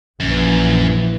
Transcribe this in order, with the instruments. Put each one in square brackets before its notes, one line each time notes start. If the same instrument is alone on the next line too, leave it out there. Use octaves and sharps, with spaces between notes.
[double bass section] A#1 E3 [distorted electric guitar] F#2